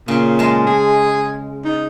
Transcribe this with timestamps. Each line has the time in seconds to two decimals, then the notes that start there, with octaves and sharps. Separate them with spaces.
0.08 A#2 C#3
0.39 G#3 A5
0.67 G#4
1.65 D#4